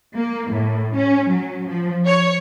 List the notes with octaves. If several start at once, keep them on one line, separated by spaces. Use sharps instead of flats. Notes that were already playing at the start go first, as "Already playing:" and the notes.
A#3
A2
C#4
F#3
F3
C#5